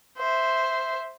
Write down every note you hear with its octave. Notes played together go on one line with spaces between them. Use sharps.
C5 E5